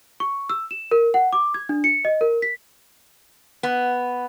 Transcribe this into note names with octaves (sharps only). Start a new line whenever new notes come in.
C#6
E6
E7
A#4
F#5
D6
G#6
D4
C#7
D#5
A#4
B6
B3